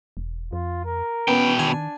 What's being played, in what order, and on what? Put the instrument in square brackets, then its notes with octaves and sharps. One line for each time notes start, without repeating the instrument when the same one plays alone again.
[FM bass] E1
[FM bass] F2 [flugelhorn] F4
[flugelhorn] A#4
[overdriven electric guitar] B2 G5 [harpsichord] B3 [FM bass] C#4
[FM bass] D#3 [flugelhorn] D4 [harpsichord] G#5